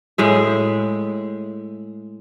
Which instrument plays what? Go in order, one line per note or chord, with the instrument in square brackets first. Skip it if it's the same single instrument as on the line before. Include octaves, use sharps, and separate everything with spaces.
[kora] A2 G#3 E5